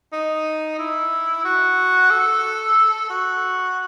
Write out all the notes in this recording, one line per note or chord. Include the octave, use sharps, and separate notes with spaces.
D#4
E4
F#4
A4
F#4